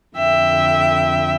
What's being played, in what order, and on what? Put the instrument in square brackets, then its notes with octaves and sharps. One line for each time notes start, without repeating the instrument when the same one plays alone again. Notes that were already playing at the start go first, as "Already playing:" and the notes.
[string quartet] F2 D3 E5 G5